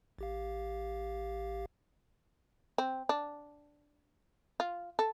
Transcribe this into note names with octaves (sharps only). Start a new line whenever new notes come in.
A1 G4 F5
C4
D4
F4
A4